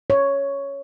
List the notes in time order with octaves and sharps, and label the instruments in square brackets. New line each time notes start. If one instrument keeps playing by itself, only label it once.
[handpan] C#5